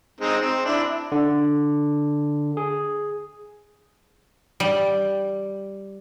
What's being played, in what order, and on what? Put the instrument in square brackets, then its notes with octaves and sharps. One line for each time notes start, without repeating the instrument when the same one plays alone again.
[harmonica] G#3 C4 D#4
C4
D4 E4
[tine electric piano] D3
G#4
[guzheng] G3